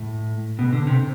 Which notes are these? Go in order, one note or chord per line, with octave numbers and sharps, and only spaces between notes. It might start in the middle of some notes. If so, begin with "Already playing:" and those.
Already playing: A2
B2
D3
C3